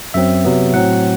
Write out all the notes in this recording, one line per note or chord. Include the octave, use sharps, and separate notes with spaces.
F#2 F#3 C4 E5
C3 F#3 B3
A2 F#3 C4 F#5